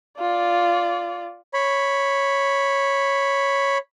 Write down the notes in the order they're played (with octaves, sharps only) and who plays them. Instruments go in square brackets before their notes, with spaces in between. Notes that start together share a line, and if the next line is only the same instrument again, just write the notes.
[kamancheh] F4 D5
[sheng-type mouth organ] C#5 B5